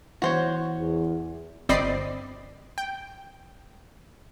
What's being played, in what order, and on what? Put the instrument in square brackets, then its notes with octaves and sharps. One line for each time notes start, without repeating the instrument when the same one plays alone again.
[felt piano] E3 B3 E4 [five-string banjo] F#4 C5 C#5
[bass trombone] E2
[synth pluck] G1 C4 D5 D#5 B5 C7
G5